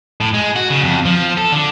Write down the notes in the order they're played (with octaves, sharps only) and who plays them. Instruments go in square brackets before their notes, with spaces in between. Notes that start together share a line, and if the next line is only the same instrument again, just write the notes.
[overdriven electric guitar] A2
G#3
F#4
C#3
F2
F3
A4
D3